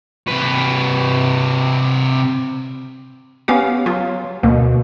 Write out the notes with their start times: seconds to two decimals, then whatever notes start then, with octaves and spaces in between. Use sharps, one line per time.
0.28 C3 B4
3.48 B3 C#4 G4 F5
3.86 F#3 F4
4.43 D2 B2 A#3